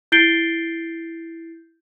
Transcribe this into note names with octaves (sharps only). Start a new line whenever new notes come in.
E4 G6 A6 C7 D7 G7